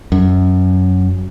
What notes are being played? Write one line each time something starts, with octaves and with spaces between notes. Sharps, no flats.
F#2